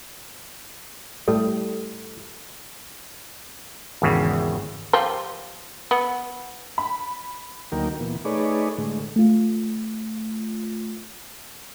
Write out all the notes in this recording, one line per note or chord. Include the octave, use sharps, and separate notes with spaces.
A2 G3 A3 A4
G#1 E2 C#3
F3 F4 G4
B3
B5
D2 F#3 A#3 D#4 A#4 G5
A#2 E3 B3
A3 D#4 G#4 B4 C#5 D5
A2 D3 G#3
A3 F4